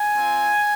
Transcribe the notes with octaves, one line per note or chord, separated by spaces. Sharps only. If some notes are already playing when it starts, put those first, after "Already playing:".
Already playing: G#5
C4 F4